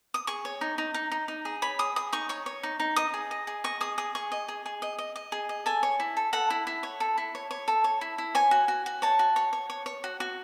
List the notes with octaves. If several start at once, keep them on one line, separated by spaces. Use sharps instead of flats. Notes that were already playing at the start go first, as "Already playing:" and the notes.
D#6
G#4 C#6
C#5
D#4
D#4
D#4
D#4
D#4
G#4
C#5 B5
G#4 D#6
G#4 D#6
D#4 C#6
C#5 C#6
C#5
D#4
D#4
D#5 D#6
G#4
D#5
G#4
D#5 C#6
G#4 D#6
G#4 D#6
G#4 C#6
D#5
G#4
G#4
D#5
D#5
D#5
G#4
D#5
A4 G#5
C#5
E4
A4
A4 F#5
E4
E4
C#5
A4
E4
C#5
C#5
A4
C#5
E4
E4
C#5 G#5
F#4
F#4
F#4
C#5 A5
F#4
C#5
C#5
C#5
C#5
F#4
F#4